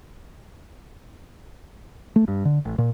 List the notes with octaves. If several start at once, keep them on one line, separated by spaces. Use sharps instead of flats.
A3
G2
D3
A1
A#2